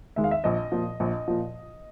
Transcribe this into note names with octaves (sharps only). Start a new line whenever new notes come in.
D#3 G#3 E5
F5
E5
A#1 D#5
A#2 F3
A#1
A#2 F3